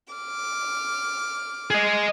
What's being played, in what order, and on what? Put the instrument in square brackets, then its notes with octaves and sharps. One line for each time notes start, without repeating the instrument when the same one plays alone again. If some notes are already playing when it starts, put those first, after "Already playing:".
[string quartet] D6 F6
[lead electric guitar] G#4 D#5